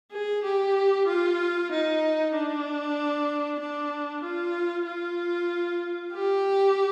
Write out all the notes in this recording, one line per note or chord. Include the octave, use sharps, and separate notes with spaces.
G#4
G4
F4
D#4
D4
D4
F4
F4
G4